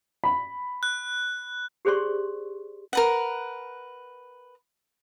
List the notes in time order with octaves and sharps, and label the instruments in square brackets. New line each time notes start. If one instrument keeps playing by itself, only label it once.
[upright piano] B5
[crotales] F#6
[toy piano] G4 G#4 C5 D5 C6 C#6
[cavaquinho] A#4 B4 F#5